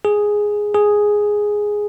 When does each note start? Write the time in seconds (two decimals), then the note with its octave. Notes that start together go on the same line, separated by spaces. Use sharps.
0.05 G#4
0.74 G#4